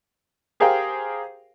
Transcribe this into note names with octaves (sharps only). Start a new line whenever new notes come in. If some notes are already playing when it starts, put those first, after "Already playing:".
G4 G#4 A#4 C5 F5 G5